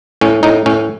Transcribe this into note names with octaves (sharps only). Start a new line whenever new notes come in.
A2 C#4
A2 D#4
A2 C#4